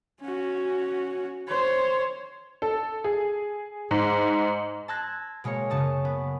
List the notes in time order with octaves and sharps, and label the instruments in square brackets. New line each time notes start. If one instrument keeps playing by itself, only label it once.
[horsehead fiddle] C#4 F#4
C5 C#5
[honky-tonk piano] A4
G#4
G#2
[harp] A5 C6 E6 F#6 G#6 A#6
B2 G#3 A#3 C#5 C#7
F#2 C#3 A5 C#6 D#6
B3